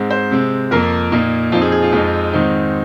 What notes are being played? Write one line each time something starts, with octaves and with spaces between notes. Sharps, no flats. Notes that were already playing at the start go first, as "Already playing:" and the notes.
Already playing: G#2 G#3 C4
C5
C3 G#3 C4
F2 F3 A#3 A#4
A#2 A#3 D#4
F2 F3 C4 D#4 F4
G#4
G#4
F4
F2 F3 G#3 C4 D#4
G#2 D#3 G#3 C4 D#4